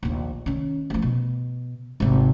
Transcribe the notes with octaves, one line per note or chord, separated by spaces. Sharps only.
A#1 D#2
D#3 C#4
D2 F3
B2
G#1 C3